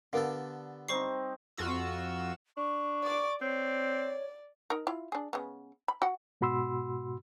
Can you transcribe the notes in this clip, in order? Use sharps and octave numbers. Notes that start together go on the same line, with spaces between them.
D3 B3 G4 A4 A#4 F5
G3 C4 D#4 C5 C#6 C7
F2 F4 F#4 E6
D4 C#6
D5 D6
C4 C#5 D5
D#4 A#4
E4 F4
D4 G#4
C#3 G#3 B3
B5
F#4 F#5
G#2 B2 F#4 B5 C6 E6